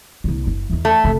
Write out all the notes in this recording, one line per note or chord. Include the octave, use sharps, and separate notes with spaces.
C2 A#3
F#1
E2 D#3
A3
F1 C3